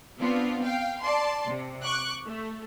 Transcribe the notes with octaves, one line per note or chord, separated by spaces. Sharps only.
B3 C4 D4 F4
F5 G5
D5 A5 C6
C3
C#6 D6 F#6
A3